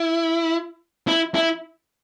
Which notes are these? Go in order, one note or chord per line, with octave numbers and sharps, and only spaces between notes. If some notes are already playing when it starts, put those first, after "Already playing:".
Already playing: E4
E4
E4